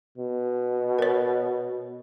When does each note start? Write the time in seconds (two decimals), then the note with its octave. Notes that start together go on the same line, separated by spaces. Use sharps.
0.18 B2
0.99 A#4 C#5